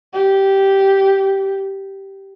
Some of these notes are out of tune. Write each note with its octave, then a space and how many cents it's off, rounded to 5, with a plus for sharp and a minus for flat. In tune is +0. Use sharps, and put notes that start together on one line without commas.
G4 -10